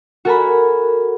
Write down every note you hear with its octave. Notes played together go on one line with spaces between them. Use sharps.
F#4 A4 A#4 G#5 A#5 B5